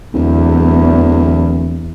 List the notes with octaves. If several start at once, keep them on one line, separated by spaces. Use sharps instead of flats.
D1 E2